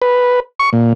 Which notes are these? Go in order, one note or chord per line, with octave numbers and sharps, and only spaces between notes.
B4
C#6
A#2